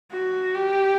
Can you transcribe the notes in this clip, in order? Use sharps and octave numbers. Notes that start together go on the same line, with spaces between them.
F#4
G4